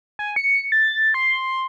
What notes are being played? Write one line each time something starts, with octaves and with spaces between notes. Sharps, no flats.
G#5
C#7
A6
C6